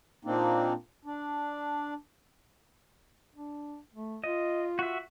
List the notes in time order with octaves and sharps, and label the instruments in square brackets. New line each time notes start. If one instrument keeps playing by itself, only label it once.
[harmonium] A#2 A#3 C4 D4 D#4
D4
[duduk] D4
A3
[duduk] F4 [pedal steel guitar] D#5
[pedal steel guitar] F#4 E5